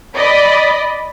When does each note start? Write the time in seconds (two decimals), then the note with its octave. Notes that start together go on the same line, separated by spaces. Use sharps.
0.15 D5 D#5 B5